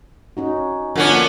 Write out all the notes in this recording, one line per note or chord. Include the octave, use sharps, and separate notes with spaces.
C#4 D#4 F#4
D3 F3 B3 C#4 A#4
A#3